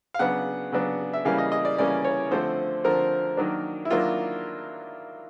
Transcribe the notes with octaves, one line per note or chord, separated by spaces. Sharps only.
F5
C#3 F#3 B3 D4 F#5
C#3 F#3 B3 D4
E5
C#3 E3 G3 A#3 C#4 F5
D#5
D#5
D5
C#3 E3 G3 A#3 C#4 D5
C#5
D3 F3 A3 C4 C5
D3 F3 A3 C4 A#4
D#3 F#3 A#3 D4
E4
D#3 F#3 A#3 D4 F4